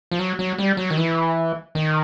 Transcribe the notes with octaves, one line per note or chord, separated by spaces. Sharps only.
F3
F#3
F#3
G3
F#3
D#3
E3
D#3